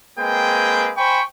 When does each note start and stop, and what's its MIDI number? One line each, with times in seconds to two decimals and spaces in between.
0.19 0.92 56
0.19 0.92 58
0.19 0.92 60
0.19 0.92 68
0.19 0.92 71
0.19 0.92 79
0.97 1.21 72
0.97 1.21 79
0.97 1.21 80
0.97 1.21 83
0.97 1.21 85